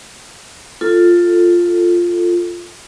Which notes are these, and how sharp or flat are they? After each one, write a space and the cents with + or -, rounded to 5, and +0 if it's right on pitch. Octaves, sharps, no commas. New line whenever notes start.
F4 +0 A4 +10